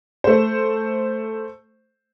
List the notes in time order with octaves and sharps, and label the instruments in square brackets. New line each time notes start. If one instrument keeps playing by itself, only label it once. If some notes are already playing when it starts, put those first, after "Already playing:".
[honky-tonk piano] A3 C5